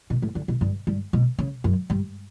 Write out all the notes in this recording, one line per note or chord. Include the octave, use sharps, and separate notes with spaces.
B2
A2
D3
B2
G2
G2
B2
C#3
F#2
G2